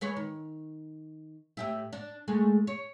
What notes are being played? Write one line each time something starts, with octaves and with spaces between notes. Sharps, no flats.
G#3 B4 C#5
D#3
A2 G4 E5
D4
G#3 A3 G#4
C#5